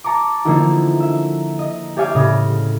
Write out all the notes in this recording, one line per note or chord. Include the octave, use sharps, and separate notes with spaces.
A5 A#5 C#6 D6
D3 F3 A#3 D#4 E4 F#4
E5
D#5
G4 C#5 D5 E5 F5 G#5
A2 C#3 D#6 A#6